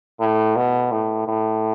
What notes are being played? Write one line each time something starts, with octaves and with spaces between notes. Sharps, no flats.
A2
B2
A2
A2